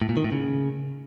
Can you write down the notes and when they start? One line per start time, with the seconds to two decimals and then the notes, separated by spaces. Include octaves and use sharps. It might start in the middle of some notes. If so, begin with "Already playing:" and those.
0.02 A2
0.09 A#2
0.17 D#3
0.24 A2
0.32 C#3